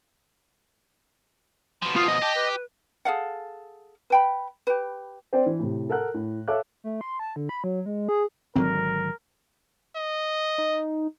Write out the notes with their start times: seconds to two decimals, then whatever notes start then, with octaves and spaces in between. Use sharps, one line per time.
1.82 B2 F3 C6
1.96 F4 D#6
2.08 D#5
2.22 G4 A5
2.35 B4
3.05 G#4 A4 F5 F#5
4.10 B4 G5 B5
4.67 G4 B4
5.33 C4 C5 D5 G5
5.46 E3
5.59 A2 C3
5.89 A4 A#4 F#5 F#6
6.14 A2
6.48 A4 C#5 E5 F5 D6 F#6
6.84 A3
7.01 C6
7.19 A5
7.36 D3
7.49 B5
7.64 F#3
7.86 G#3
8.09 G#4
8.56 G#1 D3 F#3 C4 A#4
9.96 D#5
10.58 D#4